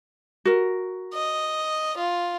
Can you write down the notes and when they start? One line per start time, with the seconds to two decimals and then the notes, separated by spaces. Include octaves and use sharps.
0.45 F#4 A#4
1.14 D#5
1.98 F4